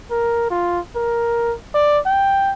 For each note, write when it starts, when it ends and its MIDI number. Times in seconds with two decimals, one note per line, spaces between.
0.11 0.50 70
0.50 0.79 65
0.95 1.54 70
1.74 1.98 74
2.05 2.53 79